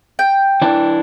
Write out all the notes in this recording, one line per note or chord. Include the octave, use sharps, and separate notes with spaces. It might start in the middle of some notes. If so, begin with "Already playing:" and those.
G5
E3 D4